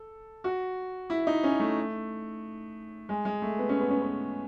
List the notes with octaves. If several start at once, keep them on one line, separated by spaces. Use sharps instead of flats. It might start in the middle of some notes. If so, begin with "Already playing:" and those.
Already playing: A4
F#4
E4
D#4
C#4
A3
G#3
G#3
A3
B3
C#4
B3
C#4
B3